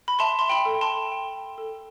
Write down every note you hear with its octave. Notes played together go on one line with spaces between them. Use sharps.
B5
E5 A5 C6
C6
G5 B5
A4
A5 C6
G5
A4